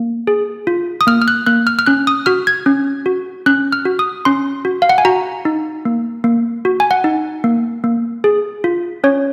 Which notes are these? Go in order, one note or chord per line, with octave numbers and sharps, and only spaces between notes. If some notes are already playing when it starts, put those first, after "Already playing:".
Already playing: A#3
G#4
F4
D#6
A#3 F6
F6
F#6
A#3 F#6
F6
F6
C#4 F#6
D#6
F#4 F6
G#6
C#4
F#4
C#4 F#6
F6
F#4
D#6
C#4 C6
F#4
F5
F#5
G#5
F#4 A#5
D#4
A#3
A#3
F#4
G#5
F#5
D#4
A#3
A#3
G#4
F4
C#4 C#5